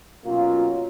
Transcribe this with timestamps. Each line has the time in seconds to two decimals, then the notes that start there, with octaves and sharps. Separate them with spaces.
0.24 B2 F#3 A#3 C#4 F4